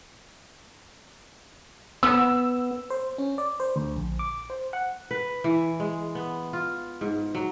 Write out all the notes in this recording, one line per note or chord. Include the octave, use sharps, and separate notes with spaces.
B3 E6
C5
C#4
D5
C5
D2
A#1
D6
C5
F#5
B4
E3
G#3
B3
F4
G#2
F#3